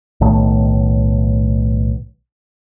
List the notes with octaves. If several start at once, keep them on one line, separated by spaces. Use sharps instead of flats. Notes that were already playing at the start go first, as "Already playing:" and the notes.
B1 A2 D#3 A3